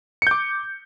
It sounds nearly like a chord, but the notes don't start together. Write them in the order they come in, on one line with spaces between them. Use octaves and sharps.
C#7 G6 D6